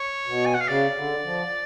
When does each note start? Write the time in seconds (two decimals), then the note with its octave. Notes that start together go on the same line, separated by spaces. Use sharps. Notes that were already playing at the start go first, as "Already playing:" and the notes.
Already playing: C#5
0.26 B2
0.46 G#5
0.54 F#5
0.61 F5
0.68 C#3 D5
0.96 D3
1.24 F3